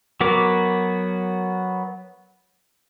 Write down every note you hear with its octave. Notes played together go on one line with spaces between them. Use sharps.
F#3 B3 F#4 A#4 D6